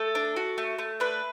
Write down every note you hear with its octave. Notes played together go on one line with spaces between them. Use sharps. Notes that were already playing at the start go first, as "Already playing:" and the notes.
Already playing: A3 A4
D4
F#4
A3
A3
D4 B4